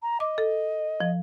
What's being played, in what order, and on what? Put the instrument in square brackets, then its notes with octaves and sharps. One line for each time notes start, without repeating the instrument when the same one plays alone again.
[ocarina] A#5
[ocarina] D#5 [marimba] D6
[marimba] A4
F3